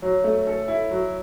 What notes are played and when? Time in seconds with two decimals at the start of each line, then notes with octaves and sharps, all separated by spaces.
0.02 F#3 C#5
0.24 A3
0.47 A4
0.68 E4
0.91 F#3